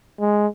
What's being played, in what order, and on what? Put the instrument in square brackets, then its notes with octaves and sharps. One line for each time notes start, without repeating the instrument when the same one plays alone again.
[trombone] G#3